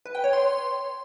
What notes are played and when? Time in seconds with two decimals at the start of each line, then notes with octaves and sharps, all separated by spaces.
0.06 B4
0.15 G5
0.24 C#5
0.33 C6